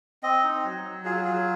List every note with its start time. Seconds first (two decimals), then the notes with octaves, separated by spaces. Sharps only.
0.23 C4 D#5
0.44 D#4
0.64 F#3
0.84 F#3
1.05 F4 G#4
1.24 F#3 G#4